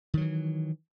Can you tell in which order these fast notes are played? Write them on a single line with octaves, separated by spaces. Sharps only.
D#3 F#3 E3